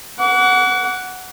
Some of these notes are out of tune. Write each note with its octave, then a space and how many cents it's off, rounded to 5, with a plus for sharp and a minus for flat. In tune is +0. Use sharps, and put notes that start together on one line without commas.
F#5 +0 D6 -45